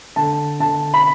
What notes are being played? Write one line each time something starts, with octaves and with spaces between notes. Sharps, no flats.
D3 A5
D3 A5
B5